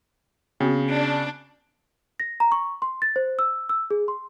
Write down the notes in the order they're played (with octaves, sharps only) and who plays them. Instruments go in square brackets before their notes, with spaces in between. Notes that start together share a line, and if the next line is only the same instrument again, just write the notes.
[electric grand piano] C#3 [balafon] B3 C4 F#4
[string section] D4
[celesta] A#6
A#5
C#6
C6
A6
C5
E6
E6
G#4
C6